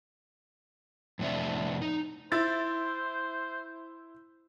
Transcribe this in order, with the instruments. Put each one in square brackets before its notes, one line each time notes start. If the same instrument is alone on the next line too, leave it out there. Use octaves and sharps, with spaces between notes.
[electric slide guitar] F2 A2 C3 D4 E5
D#4
[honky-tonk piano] E4 A6 [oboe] C5